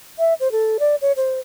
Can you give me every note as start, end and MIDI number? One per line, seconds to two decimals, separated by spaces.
0.19 0.34 76
0.40 0.51 72
0.52 0.77 69
0.79 0.95 74
1.02 1.12 73
1.17 1.40 72